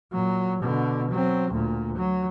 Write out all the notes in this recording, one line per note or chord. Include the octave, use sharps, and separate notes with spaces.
A#2 F#3
B2 D3
F#3 C4
D2 A#2
F#3